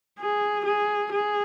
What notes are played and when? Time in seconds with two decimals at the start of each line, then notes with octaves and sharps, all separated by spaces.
0.19 G#4
0.65 G#4
1.12 G#4